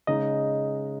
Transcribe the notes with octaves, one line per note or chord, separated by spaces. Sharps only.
C#3 G#3 D#4 D#5